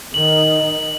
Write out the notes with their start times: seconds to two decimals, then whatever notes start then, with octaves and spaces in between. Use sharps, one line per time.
0.14 D#3 D#4 F#7